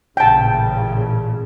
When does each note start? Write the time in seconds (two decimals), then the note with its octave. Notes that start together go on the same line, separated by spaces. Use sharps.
0.17 A1 A#2 C#3 G5 A5